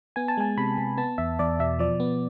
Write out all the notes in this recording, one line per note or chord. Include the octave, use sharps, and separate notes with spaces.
B3 G#5
A5
G#3 G#5
C3 B5
C3
B3 A5
E2 E5
E2 D5
B2 E5
F3 D5
B3